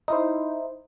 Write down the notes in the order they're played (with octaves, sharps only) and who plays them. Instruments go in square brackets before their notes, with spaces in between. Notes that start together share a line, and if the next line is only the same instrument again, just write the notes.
[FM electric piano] D#4 E4 C5